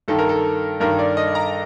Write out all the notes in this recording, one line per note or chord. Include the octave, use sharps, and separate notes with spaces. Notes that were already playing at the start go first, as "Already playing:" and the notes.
G2 D#3 A4
A#4
A4
G2 D#3 A#4
D5
D#5
A#5